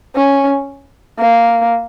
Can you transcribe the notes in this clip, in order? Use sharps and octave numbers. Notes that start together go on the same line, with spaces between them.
C#4
A#3